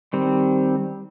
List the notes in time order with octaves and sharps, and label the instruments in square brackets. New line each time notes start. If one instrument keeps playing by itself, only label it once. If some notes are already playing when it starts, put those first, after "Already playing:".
[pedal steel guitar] D#3 G3 C4